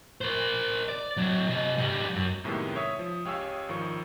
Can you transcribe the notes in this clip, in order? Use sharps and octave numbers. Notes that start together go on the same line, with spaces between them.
A#4 C5
D5
F#3 C4
C3 D#5
G#2 G3
F#2
F#2 A2 C3 D#3 G#3 B3
C#5 E5 C#6 D#6
F3
C#2 G4 C#5 F5 G#5 E6
G#1 D#3 F3 C#6